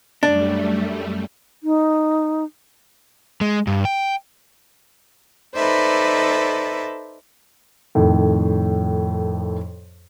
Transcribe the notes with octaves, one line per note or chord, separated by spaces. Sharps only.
F#2 G3 A3 D4
D#4
G#3
G2
G5
D#4 A4 B4 C5 D5 E5
F2 A2 D#3